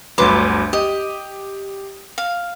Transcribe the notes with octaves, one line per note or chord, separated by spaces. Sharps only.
G1 D2 F#3 B4 C6 D6
G4 D#5
F5